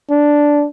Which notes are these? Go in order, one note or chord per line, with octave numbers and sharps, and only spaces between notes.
D4